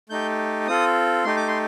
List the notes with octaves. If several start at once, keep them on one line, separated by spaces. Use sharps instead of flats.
A3 D#4 G4 G6
C4 F4 A4 D#6
A3 D#4 G4 C6
D6
C6